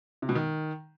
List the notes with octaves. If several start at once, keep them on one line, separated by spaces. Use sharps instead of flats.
C3
B2
D#3